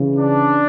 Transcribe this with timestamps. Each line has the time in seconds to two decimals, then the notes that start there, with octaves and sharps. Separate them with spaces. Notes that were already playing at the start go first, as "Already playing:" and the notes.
Already playing: C#3 E3
0.17 D4